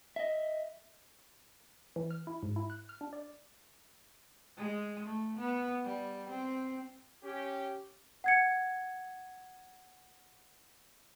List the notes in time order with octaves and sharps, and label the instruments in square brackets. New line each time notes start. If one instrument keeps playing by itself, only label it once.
[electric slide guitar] D#5 E5
[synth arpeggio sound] E3
F6
E4
G#2
E4
F#6
F6
D4
D5
[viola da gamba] G#3
A3
B3
G3
C4
[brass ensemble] C#4 G4
[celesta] F#5 G#6 C#7